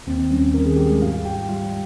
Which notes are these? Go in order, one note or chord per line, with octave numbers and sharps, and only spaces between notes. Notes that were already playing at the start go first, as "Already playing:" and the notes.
D#2 C4
G3 C#4
D#3 A#4
G#4
G3 G4
G#3 G#4
G#2 F4 F5
G#2 G4 G5
G3 F4 F5